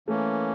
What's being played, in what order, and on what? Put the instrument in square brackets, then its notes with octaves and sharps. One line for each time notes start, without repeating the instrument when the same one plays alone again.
[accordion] E3 A#3 C#4 [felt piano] A3